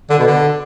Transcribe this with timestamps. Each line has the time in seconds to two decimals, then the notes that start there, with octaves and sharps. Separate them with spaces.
0.10 D3
0.19 B2
0.27 D3